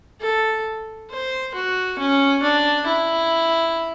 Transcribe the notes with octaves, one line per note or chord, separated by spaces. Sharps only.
A4
C5
F#4
C#4
D4
E4